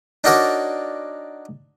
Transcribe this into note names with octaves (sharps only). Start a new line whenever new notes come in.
D4 D#4 F#4 A#4 C#5 D5